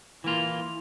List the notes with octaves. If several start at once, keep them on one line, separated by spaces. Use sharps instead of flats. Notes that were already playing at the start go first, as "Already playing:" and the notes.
E3 A#3 E4 F4